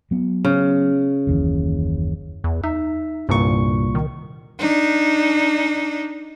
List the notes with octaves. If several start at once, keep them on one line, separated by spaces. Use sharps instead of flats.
F#3 B3
C#3
F#1 D#2 E3
E2
D#4 E5
C2 G2 A#2 C#6
D#3
D4 D#4